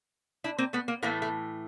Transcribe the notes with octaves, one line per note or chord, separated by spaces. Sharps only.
D4 E4
A#3 C4
A3 B3
A#3
A2 E3 A3 A#3
A3